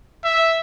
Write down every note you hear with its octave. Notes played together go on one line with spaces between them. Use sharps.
E5